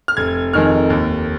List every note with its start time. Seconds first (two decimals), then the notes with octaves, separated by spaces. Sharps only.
0.08 F6
0.17 F1 G#6
0.53 F2 D#3 G#3 F6
0.90 D#2